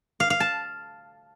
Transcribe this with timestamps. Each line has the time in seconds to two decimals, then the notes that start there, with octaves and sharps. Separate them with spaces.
0.20 F5
0.30 F5
0.40 A5